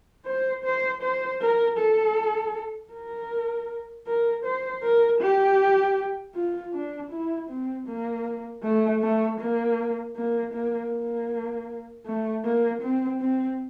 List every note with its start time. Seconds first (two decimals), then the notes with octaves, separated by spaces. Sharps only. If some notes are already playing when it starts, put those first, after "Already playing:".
0.26 C5
0.64 C5
1.03 C5
1.41 A#4
1.78 A4
2.93 A#4
4.07 A#4
4.45 C5
4.83 A#4
5.21 G4
6.35 F4
6.73 D4
7.11 E4
7.49 C4
7.87 A#3
8.63 A3
9.02 A3
9.40 A#3
10.16 A#3
10.53 A#3
10.92 A#3
12.06 A3
12.44 A#3
12.82 C4
13.20 C4